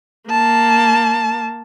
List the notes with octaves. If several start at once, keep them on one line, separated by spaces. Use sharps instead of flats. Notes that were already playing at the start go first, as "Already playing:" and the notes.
A#3 A5